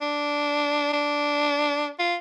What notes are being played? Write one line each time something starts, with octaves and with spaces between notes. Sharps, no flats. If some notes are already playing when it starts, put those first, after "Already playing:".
D4
D4
F4